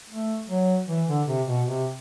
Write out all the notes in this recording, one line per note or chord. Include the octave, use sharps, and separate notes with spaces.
A3
F#3
E3
D3
C3
B2
C3